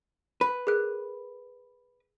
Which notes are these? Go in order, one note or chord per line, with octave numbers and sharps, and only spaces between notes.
B4
G#4 A#4 F#6